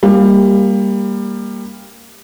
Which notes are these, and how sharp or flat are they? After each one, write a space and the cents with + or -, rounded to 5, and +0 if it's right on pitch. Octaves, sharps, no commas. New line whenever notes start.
G3 +15 A#3 +0